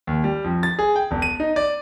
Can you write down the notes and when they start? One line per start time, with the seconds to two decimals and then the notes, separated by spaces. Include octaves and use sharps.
0.07 D#2
0.24 G3
0.44 F2
0.63 A6
0.79 G#4
0.96 G5
1.11 E1
1.22 D#7
1.40 D#4
1.56 D5